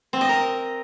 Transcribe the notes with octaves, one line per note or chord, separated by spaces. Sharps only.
C4
D#5
A#4